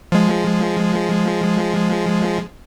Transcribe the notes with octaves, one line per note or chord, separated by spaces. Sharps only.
F3 G#3